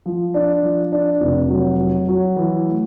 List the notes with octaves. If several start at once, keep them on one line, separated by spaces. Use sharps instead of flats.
F3
D4
F3
D4
F1
F#3
F#3
F#3
E3
A3